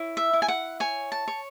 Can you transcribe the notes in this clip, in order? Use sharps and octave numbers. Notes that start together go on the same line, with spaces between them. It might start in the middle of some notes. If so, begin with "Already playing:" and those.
Already playing: E4 C#5
E5
E4
G#5
F#5
C#5 G#5
A5
C#5